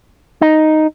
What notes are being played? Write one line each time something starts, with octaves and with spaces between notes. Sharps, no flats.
D#4